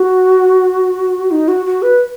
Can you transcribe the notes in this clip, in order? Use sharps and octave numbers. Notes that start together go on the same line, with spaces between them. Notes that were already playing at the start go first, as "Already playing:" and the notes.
Already playing: F#4
D#4
F#4
F#4
B4